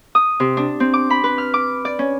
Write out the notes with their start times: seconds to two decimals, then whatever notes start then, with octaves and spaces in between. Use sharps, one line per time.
0.15 D#6
0.40 C3
0.57 D4
0.80 C4
0.94 D6
1.10 B5
1.24 B4
1.38 F6
1.54 D6
1.85 D5
1.99 C#4